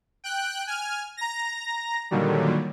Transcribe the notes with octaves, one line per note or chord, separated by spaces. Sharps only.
G5 F#6
G#5 F6
A#5 A#6
A#2 D3 D#3 F#3 G3